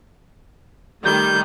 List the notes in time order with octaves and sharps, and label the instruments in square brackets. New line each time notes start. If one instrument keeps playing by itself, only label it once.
[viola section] D#3 G3 A3 [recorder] G6